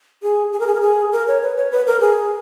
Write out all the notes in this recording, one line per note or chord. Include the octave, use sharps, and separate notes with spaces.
G#4
G#4
A#4
G#4
A#4
G#4
A#4
C#5
B4
C#5
B4
A#4
G#4